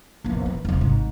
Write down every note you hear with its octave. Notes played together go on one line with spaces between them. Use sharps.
A#1 E2
E3
E1 C2
G#1 G#2